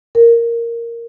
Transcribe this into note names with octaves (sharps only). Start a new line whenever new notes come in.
A#4